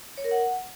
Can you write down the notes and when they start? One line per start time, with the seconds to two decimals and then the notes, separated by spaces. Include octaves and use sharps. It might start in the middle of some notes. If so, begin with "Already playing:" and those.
0.18 C#5
0.24 A#4
0.31 F#5